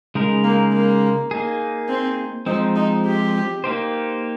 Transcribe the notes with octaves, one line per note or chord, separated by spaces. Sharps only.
C#3 G#3 D#4 A#4
A#3
A#3
A#3 D#4 G#4
C4
F3 G#3 C4 D#4
D#4
G4
A#3 D#4 G4 C5